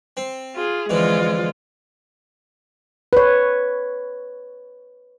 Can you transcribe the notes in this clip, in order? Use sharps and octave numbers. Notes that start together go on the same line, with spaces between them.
C4
F4 G#4
F2 D3 E3 G#3 F4
B4 C#5